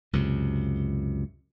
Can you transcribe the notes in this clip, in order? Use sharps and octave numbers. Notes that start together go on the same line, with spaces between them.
C#2 F#2 C3